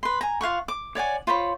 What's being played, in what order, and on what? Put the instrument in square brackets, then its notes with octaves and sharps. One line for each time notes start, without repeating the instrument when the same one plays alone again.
[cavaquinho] B4 C6
G#5 A#5
F4 F5 F#5 C#6
D6
C#5 D5 F#5 G#5
F4 C5 C#5 B5